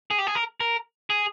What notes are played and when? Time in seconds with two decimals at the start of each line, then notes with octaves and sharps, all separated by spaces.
0.11 G#4
0.18 G4
0.27 G#4
0.35 A#4
0.60 A#4
1.10 G#4